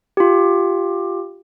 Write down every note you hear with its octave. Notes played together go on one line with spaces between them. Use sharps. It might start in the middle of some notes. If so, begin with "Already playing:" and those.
F4 G4